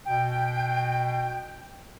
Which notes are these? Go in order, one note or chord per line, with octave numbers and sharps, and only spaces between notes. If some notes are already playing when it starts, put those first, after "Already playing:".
B2 G5